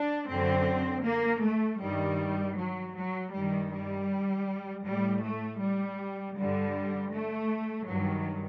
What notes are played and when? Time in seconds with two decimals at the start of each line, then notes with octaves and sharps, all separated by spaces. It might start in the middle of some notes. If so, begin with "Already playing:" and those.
Already playing: D4
0.29 F#2 D3 C4
1.05 A#3
1.43 A3
1.81 G2 D#3 G3
2.57 F#3
2.96 F#3
3.33 G2 D#3 G3
3.72 G3
4.85 A2 G3
5.24 A3
5.61 G3
6.37 G2 D3 G3
7.13 A3
7.89 G2 D#3 F#3